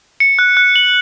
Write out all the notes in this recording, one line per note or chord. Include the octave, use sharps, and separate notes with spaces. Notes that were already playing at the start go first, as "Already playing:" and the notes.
C#7
F#6
F#6
F#7